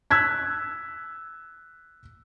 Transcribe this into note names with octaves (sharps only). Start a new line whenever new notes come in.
E6 F#6 G#6 B6